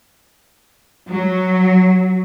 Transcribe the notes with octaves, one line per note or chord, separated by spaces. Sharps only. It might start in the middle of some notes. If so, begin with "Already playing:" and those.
F#3